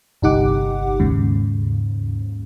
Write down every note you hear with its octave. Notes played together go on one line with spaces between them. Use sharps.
G1 C2 D#4 G4 F#5 D6
D#2 G#2 C#3